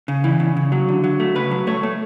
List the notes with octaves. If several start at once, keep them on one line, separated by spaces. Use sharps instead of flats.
C#3
E3
C#3
C#3
F#3
D3
F#3
A3
C#3 B4
F#3
A3 C#5
A3